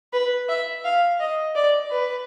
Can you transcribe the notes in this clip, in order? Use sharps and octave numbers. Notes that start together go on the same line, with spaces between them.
B4
E5
F5
D#5
D5
B4